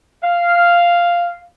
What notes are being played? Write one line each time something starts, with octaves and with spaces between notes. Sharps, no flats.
F5